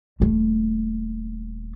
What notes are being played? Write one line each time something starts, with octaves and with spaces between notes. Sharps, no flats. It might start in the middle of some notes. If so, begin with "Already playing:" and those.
D#1 A3